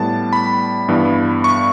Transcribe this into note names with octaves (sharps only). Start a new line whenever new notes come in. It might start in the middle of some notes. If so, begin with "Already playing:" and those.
Already playing: A2 G3 B3 A5
B5
G2 E3 B3
C#6